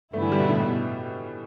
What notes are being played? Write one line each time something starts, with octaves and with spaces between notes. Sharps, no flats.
G2 D3 A3 B3 E4
E3
G3
B2
A2
B2